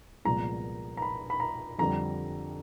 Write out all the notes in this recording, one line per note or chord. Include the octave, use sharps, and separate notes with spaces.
C2 A#2 F3 G#3 B3 A#5
A#5
B5
B5
A#5
F2 D3 G3 A#5